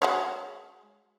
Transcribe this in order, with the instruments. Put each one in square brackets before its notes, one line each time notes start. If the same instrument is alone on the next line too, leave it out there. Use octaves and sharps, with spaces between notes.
[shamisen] G#3 F#4 C#5